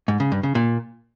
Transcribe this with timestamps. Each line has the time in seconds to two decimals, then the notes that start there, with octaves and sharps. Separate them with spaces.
0.08 G#2
0.20 C#3
0.32 G2
0.43 C#3
0.55 A#2